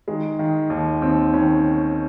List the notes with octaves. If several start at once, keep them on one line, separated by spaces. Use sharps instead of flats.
D#3 G#3
D#3
D#2
D#2 C4
D#3 C#4